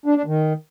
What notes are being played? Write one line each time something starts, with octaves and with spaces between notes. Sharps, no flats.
D4
D4
D#3